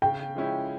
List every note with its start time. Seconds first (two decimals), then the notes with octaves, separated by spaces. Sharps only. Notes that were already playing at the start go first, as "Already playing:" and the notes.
0.02 C#3 G5
0.35 F3 G#3 C#4 E4